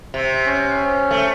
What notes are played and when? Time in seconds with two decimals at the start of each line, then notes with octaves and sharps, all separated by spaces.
0.14 C3
0.46 C#4
1.11 A3